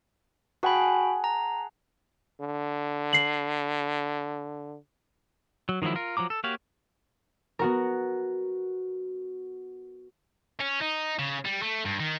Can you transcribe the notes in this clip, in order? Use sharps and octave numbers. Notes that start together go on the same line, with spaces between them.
F#4 G#4 F#5 G5 A5 B5
A#5
D3
C7 F#7
F#3
D#3 F3 F#3 G#3 E4
F4 A#4
F3 F#3 A#5 D6
A4
A#3 F#4 G4 C#5 F5
B3 F#4 A#4
C#4
D#4
C#3
G3
A3
G2
D#3